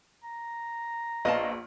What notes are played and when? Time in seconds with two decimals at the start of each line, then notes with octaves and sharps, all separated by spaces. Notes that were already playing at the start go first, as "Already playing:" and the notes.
0.23 A#5
1.25 A#1 B3 D#5 F5 A5 F6